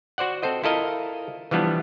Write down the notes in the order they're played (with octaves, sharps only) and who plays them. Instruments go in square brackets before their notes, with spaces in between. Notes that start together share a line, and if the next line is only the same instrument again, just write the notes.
[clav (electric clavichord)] F#4 C5 D5 F#5
C4 A4 C5 D#5
E4 F4 A4 A#4 D#5 F5
E3 F3 G3 B3 D4